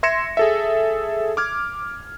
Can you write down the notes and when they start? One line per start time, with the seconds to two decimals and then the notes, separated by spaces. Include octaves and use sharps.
0.03 E5 C6 G#6 A#6 C#7 E7
0.37 G#4 A4 E5
1.37 D6 F6 G#6